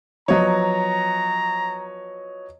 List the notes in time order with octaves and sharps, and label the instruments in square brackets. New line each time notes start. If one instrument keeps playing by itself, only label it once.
[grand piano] F3 F#3 B3 [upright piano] C#5 D#5 [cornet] A#5